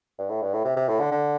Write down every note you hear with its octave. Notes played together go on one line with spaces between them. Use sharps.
G2
A2
G2
A2
C3
C3
A2
D3
D3